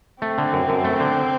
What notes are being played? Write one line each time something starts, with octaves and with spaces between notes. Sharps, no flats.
A3 C4
D3
F#2
F#2
A3
D3